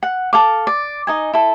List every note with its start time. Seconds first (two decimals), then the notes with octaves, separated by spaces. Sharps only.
0.03 F#5
0.33 A4 F5 D6
0.67 D5
1.07 D#4 D#5 G#5
1.33 E4 A4